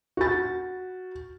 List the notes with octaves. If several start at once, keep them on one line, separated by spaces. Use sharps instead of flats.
F#4 A6